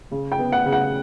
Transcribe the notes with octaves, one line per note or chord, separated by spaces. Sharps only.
C#3
G5
B3
F#5
C#3
F#5